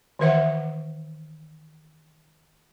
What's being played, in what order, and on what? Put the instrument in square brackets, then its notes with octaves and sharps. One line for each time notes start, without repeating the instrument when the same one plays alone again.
[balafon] D#3 E3 B4 E5 F#5